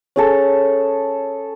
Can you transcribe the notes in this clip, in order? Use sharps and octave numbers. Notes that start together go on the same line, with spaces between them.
C#4 G#4 A4